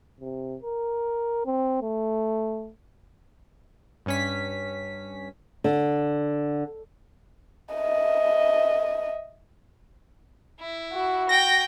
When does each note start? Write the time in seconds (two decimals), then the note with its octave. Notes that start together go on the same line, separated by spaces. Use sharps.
0.20 C3
0.63 A#4
1.45 C4
1.82 A3
4.06 G2 C#4 B6
5.64 D3
7.75 D#5 E5
10.60 E4
10.93 F#4
11.29 G5 A#6